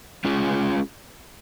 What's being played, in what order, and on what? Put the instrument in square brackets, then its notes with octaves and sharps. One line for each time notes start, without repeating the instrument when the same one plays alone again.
[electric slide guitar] G#3 C#4 F4 G#4